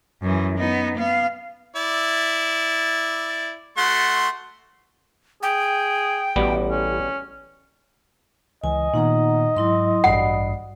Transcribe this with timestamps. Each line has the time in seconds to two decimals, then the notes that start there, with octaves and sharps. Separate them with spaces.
0.22 F#2 E3
0.58 B3 D#4
0.98 B3 F5
1.76 E4 D5
3.78 A3 F#4 C6
5.43 G#4 G5
6.36 A1 B2 G3 B3
6.71 C#4
8.64 C#2 E3 D#5 G#5
8.94 A#2 D#3 B3 D#4 F#5 A#5
9.57 G#2 F#3 E4 C6
10.04 A1 G2 F#4 D5 F#5 B5 C7